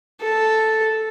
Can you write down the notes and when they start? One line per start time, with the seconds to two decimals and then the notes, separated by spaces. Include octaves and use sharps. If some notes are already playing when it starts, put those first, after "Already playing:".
0.21 A4